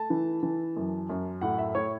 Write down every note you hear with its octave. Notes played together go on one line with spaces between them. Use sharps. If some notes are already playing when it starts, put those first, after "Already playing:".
Already playing: A3 A5
E3
E3
F#2
F#2
A2 F#5
E5
A2 C#5